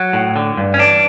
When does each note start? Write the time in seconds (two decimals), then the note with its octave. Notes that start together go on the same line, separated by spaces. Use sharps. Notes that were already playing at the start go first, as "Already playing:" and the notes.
Already playing: F#3
0.13 A2
0.36 D3
0.57 G2
0.74 C#4
0.79 E3 D4